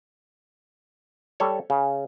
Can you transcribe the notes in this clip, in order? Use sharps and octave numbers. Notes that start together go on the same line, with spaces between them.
G3 A4 C#5
C#3